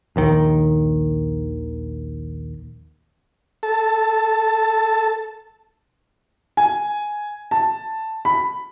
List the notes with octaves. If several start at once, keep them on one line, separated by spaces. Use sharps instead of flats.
A#1 D#2 D#3
A4 A5
G#5
A5
B5